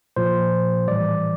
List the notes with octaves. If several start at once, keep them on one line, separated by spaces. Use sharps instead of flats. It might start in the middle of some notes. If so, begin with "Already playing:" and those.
A#2 F3 C5
A2 E3 G3 D5